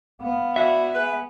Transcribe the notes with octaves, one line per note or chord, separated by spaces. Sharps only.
B3 F5
D4 E4 F#4 E5
G#4 B4